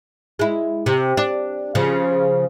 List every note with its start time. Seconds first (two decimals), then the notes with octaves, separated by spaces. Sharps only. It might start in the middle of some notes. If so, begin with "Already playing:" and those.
0.39 G#3 E4
0.86 C3
1.17 D4
1.75 C#3 F3